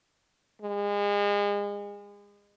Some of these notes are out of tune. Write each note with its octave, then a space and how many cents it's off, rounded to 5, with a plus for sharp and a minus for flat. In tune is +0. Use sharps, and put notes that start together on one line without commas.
G#3 -35